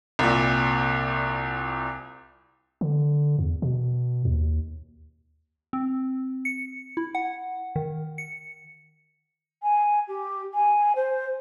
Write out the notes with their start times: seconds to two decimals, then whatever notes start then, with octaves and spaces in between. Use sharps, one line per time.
0.19 C2 A#2
2.81 D3
3.39 E2
3.62 B2
4.25 D#2
5.73 C4
6.45 C#7
6.97 E4
7.15 F#5
7.76 D#3
8.18 C#7
9.63 G#5
10.08 G4
10.54 G#5
10.96 C5